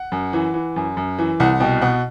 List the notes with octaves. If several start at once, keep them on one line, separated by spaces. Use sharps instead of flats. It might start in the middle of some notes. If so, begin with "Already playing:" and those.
Already playing: F#5
F#2
E3
E3
F#2
F#2
E3
C2 F#5
B2 G5
B2 F#5